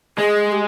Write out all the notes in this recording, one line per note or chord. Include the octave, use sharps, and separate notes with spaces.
G#3 G#4
G4